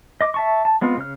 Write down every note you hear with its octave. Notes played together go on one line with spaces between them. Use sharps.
D#5 D6
E5 A5 C#6
A5
G#3 B3 C4 F4
C#3 F6